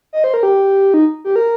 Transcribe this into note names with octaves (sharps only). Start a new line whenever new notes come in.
D#5
C5
A#4
G4
D#4
G4
A#4